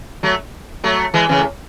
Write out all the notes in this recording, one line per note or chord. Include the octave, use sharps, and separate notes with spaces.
F#3 A3
F#3 A3
E3 G#3
C#3 E3
A2